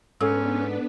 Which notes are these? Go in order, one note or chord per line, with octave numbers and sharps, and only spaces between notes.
G#2 B3 C#4 D4 A4 B4 E6